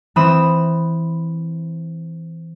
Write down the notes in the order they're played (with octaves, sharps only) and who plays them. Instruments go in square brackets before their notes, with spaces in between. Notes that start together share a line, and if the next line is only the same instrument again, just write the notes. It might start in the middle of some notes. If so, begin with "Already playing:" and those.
[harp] E3 C4 B5 D#6 E7